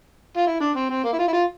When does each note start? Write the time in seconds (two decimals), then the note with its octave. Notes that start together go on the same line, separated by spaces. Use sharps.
0.37 F4
0.47 E4
0.60 D4
0.75 C4
0.89 C4
1.04 A#3
1.13 E4
1.18 F4
1.28 E4
1.32 F4